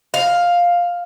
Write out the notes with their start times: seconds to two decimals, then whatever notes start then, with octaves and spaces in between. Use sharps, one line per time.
0.14 F5